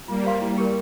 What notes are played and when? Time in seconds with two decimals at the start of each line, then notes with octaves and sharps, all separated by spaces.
0.08 G3 A#3 F4
0.25 C5 F5 C6
0.41 G3 E4
0.58 G4 A#4